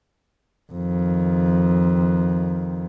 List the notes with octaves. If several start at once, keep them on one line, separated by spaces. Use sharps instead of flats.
F2 D#3